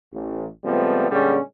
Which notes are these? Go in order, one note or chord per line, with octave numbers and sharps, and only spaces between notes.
A1
C#2 F3 G3 A3 B3 C4
A#2 D3 G3 G#3 C#4 G#4